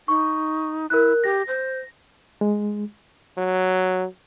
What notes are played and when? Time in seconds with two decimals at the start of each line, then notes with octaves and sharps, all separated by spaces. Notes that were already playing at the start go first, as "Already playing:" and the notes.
0.08 D#4 C#6
0.90 E4 A#4 F#6
1.24 G4 A#6
1.48 C5
2.41 G#3
3.38 F#3